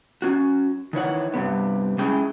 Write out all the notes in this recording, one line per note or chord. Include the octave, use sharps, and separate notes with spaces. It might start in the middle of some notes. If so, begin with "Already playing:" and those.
C#4 F#4
D#3 E3 C#5 F#5
G2 C3 B3
G#3 C#4 E4 G#4 G5